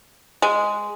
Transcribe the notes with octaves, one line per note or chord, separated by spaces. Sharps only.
G#3